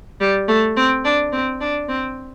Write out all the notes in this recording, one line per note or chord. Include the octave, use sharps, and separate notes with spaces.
G3
A3
C4
D4
C4
D4
C4